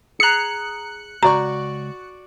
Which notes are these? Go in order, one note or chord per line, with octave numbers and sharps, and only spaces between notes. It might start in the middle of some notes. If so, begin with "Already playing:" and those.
G#4 A#5 F#6 C#7
C#2 F#4 D5 A#5 C#6